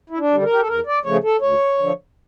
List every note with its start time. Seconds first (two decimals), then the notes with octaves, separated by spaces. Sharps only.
0.10 E4
0.19 D4
0.31 D3 G3
0.43 A#4
0.53 G4
0.60 A4
0.67 E2 A#4
0.86 D5
1.04 C#3 F3 A3 C#5
1.24 A4
1.41 D2 C#5
1.78 D3 F3